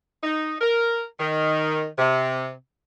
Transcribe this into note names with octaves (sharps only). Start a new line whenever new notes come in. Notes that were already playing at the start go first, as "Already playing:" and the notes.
D#4
A#4
D#3
C3